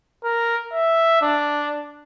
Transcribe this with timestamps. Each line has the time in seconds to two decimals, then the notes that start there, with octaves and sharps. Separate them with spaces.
0.24 A#4
0.73 E5
1.22 D4